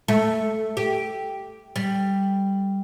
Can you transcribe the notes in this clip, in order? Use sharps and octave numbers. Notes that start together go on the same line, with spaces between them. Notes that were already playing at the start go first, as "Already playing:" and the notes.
A3
G4
G3